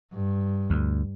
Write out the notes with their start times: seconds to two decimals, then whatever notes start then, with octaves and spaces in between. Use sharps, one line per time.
0.13 G2
0.70 D2